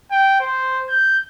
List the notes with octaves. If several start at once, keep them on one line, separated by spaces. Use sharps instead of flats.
G5
C5
G6